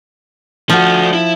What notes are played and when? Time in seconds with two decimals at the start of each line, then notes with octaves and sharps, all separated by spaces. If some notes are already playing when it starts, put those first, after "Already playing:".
0.70 F3 A3 F#4
1.14 E4